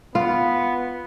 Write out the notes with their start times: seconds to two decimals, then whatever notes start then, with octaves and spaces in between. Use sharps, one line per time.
0.15 B3 F4